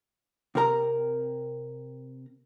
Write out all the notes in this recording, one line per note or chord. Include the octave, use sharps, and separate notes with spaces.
C3 C4 A#4 A#5